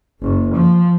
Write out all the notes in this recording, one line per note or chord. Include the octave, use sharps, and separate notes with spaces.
F#1
F3